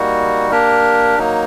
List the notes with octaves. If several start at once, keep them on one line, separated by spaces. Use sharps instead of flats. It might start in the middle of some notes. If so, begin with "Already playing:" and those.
Already playing: G3 A#3 D#4 F#4
A#3 D4 G4 A#4
F#3 A#3 D#4